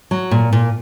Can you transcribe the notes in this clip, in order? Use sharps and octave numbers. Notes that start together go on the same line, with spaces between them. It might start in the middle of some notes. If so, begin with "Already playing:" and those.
F#3
A#2
A#2